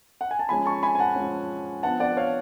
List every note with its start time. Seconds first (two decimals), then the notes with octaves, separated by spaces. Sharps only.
0.21 F#5
0.31 G#5
0.39 A5
0.49 F3 G#3 C#4 G#5 B5
0.66 A5 C#6
0.83 G#5 B5
0.95 G#5
0.99 F#5 A5
1.16 F3 G#3 C#4
1.83 F3 B3 D4 F#5 A5
2.00 D5 F#5
2.17 C#5 F5